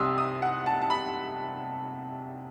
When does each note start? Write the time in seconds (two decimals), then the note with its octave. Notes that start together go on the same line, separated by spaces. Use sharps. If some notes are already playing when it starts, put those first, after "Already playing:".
Already playing: C2 C3 G3 C6 D#6 E6
0.18 D#6
0.42 F#5
0.66 A5
0.81 A5
0.90 B5